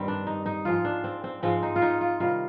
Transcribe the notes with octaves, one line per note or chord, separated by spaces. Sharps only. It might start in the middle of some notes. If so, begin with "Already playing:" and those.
Already playing: G2 D#3 G3 C4
D4
D#4
D#4
G#2 F3 G#3 F4
D4
C4
C4
G#2 F3 G#3 C4
D#4
F4
D#4
F4
C3 D#3 G3 F4